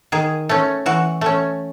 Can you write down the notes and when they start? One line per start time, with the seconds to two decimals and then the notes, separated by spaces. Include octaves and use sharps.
0.12 D#3 G#4
0.49 A3 C#4
0.86 E3 F#4
1.21 A3 C#4